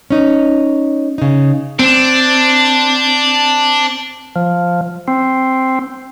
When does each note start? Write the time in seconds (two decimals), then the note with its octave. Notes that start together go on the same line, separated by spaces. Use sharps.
0.10 C#4 D#4
1.18 C#3 D#4
1.79 C4 D4
4.36 F3
5.08 C4